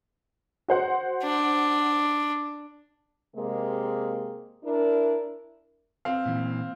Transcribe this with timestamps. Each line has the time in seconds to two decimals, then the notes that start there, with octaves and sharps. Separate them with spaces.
0.68 F#4 C5 F#5
1.23 D4
3.35 C3 G#3 A#3
4.64 D4 E4 A#4
6.05 C4 F5
6.26 A#2 E3